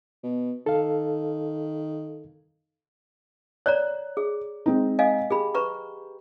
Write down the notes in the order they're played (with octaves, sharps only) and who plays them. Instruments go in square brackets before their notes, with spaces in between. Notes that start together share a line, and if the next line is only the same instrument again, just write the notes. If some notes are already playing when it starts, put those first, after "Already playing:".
[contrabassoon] B2
[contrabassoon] D#3 [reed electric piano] A4 F5
[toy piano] C#5 D5 A#5 [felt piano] F#6
[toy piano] G#4
[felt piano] G#3 C4 D#4
[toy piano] D#5 F5 G#5
[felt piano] G4 [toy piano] G#4 B5
[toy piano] B4 A#5 C#6